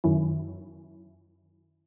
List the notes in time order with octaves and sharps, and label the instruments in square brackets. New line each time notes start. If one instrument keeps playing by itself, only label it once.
[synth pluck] F#2 D#3 F#3 C#4 E4